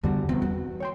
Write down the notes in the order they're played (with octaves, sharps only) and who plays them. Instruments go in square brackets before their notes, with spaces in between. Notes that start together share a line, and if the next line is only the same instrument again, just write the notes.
[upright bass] E2 [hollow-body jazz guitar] D3 G3 F#4
[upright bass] E2 [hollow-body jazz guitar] C4
[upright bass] E3 G3 [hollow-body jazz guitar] F#4
[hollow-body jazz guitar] C#5 G5 C6